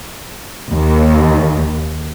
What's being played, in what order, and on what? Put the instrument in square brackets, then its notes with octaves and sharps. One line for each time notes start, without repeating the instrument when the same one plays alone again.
[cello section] D#2